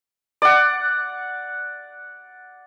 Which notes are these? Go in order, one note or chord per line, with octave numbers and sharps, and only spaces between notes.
D5 F#5